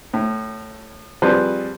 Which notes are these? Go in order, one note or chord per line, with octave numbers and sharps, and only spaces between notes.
A2
F3 G3 C4 G#4 B4 C5